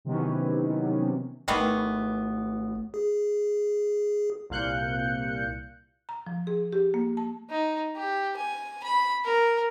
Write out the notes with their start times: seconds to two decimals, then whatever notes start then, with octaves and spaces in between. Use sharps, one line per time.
0.05 C3 D#3 E3 F#3 B3 C#4
1.48 G#1 D#3 E3 A3 B3
2.94 G#4
4.50 C2 A#2 F5 F#6 G6 C#7
6.09 A#5
6.27 F3
6.47 G#4
6.73 G4
6.94 A#3
7.17 A5
7.50 D#4
7.95 G4
8.37 G#5
8.83 B5
9.25 A#4